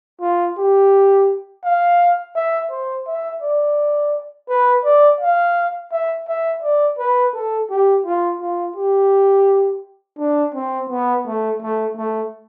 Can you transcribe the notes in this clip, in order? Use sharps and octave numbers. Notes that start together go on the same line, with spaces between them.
F4
G4
F5
E5
C5
E5
D5
B4
D5
F5
E5
E5
D5
B4
A4
G4
F4
F4
G4
D4
C4
B3
A3
A3
A3